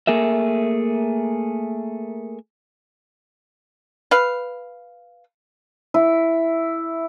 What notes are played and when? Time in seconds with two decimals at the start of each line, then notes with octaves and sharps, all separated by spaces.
0.07 A3 A#3 G#4 A#4 E5
4.11 B4 F5
5.94 E4